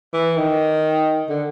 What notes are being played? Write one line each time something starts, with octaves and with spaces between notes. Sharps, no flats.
E3
D#3
D3